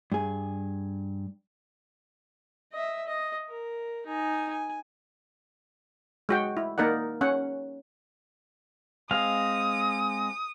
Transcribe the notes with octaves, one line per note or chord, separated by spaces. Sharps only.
G2 G#4
D#5 E5
D#5
A#4
D#4 G#5
G#5
G#3 F#4 G5
E4
A#3 D#4 A#4 D5 F#5
C#4 F#5
G#3 C4 F5 D#6